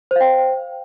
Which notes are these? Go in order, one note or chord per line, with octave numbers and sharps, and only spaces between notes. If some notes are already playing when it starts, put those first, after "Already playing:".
C5 F5 G5